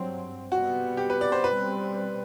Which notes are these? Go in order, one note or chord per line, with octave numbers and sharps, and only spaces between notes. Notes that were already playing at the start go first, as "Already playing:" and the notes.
Already playing: G2 F#3 C4
C3 G3 B3 F#4
G4
B4
D5
C5
B2 G3 C4 B4